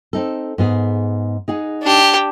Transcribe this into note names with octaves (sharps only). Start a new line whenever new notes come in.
C4 D#4 A4
G#2 B3 G#4
D#4 G#4 F#5
D4 G4